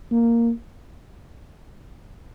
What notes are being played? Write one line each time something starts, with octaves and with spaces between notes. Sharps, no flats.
A#3